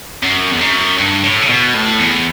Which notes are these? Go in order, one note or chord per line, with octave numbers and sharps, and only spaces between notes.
F#2
E2
F#2
G2
A2
C#3
B2
A2
E2